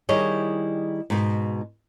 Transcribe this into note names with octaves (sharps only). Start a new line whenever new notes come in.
D#3 G3 E4 G#4 C#5 D#5
G#2 B2